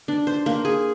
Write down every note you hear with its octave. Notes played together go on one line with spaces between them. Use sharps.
D4
C5
A#3
G#4